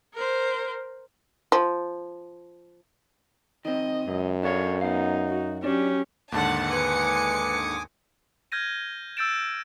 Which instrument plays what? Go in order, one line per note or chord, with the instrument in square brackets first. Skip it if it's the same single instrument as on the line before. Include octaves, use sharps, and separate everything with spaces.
[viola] A#4 C5
[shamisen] F3
[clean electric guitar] D#3 C4 [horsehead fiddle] D#5
[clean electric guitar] C#2 [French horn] F#2
[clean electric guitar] D4 A4 F5 [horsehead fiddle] C#5
[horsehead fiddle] B3 [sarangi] D#4 [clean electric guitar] F5 F#5
[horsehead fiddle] F#4
[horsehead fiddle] F#3 G4 [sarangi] C#4 [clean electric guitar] D4
[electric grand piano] D#2 G#2 D3 [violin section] F#5 A5
[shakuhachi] B4 [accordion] G#5 D6 D#6 [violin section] C#7
[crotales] F6 G6 G#6 A#6 D#7
E6 G6 A6 D7 E7